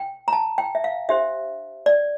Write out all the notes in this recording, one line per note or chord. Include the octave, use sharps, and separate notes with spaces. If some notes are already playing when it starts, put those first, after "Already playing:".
Already playing: G5
A#5
A5
G5
E5
F5
D4 G4 C5 E5
D5